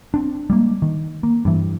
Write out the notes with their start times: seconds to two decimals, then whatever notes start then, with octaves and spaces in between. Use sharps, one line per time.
0.14 C4 D4
0.50 G3 G#3 A#3
0.82 D#3
1.23 A#3
1.45 G2 E3